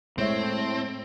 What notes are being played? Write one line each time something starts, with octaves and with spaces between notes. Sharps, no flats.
A2 G#3 C4 C#5 E5